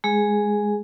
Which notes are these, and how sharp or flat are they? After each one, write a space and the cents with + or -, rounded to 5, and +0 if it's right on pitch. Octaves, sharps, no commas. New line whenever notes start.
G#3 +0 G#4 +0